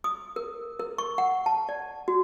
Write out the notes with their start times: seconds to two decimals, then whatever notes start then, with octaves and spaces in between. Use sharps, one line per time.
0.04 D#6
0.36 A#4
0.80 A#4
0.98 C#6
1.18 F#5
1.46 A5
1.69 D5
2.08 F#4